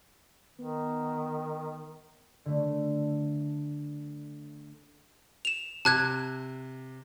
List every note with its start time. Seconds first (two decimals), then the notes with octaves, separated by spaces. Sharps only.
0.58 D#3 B3
2.45 D3 A3
5.45 E7 F7
5.85 C3 A5 F#6 G#6